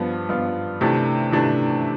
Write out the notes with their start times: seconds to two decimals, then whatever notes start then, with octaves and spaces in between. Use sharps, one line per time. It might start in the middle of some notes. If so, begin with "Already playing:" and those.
Already playing: G2 F3 B3 F4
0.29 G2 F3 B3 F4
0.81 C3 E3 A3 D4
1.32 C3 E3 A3 D4